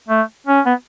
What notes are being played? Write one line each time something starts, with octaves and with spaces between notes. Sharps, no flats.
A3
C#4
B3